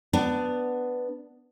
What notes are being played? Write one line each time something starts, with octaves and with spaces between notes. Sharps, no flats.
B3 D4